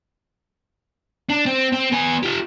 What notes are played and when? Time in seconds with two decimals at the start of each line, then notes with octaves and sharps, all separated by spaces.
1.30 D4
1.46 C4
1.73 C4
1.92 B3 G#5
2.23 F4 G4